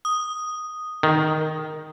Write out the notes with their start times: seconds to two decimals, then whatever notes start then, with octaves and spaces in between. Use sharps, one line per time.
0.05 D#6
1.03 D#3